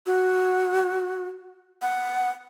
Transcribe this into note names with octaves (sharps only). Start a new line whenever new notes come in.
F#4
F#5